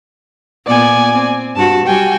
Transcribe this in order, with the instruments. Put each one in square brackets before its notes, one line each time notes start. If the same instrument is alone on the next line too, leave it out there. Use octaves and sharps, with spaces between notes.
[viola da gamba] A#2 B3 [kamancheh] D5 G#5
[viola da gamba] C4
[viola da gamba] G2 F#4 [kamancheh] A5
[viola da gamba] G3 F#4 [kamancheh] G5 G#5